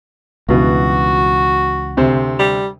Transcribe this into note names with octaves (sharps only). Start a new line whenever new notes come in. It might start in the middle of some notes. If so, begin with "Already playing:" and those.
C#2 G2 B2 E3 F#4
D2 C3 C5
G3